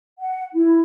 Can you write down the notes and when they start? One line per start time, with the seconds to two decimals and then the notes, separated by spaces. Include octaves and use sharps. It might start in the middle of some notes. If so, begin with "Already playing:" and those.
0.20 F#5
0.54 E4